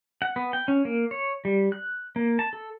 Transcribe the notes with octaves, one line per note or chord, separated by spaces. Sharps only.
F#5
B3
G5
C#4
A#3
C#5
G3
F#6
A#3
A5
A4